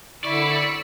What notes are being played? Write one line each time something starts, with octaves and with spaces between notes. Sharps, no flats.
D3 E4 D5 B5 C#6 E6 B6 C#7